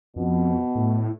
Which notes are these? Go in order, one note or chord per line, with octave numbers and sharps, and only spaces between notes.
F2 B2
A2